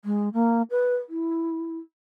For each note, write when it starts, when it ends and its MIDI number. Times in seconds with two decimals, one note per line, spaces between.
0.05 0.29 56
0.34 0.62 58
0.71 0.95 71
1.09 1.78 64